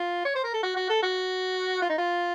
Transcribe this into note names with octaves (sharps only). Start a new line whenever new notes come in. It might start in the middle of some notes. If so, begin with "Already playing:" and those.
Already playing: F4
C#5
C5
A#4
A4
F#4
F#4
A4
F#4
F4
D#4
F4